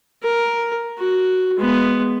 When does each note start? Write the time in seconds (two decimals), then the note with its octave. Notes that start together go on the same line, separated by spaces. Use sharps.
0.23 A#4
0.98 F#4
1.57 G#3 B3